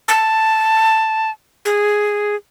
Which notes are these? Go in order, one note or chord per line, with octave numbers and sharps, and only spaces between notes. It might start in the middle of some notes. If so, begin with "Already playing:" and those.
A5
G#4